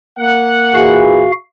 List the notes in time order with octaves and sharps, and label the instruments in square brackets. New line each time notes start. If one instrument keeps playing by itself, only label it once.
[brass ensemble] A#3 F#5
[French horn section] A#2 E3 G#4 [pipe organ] F#4 F5